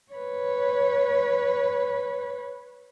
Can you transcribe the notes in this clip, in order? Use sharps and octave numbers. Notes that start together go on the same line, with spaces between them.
B4 C#5